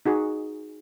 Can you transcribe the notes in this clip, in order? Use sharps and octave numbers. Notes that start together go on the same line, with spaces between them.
D#4 F#4 G#4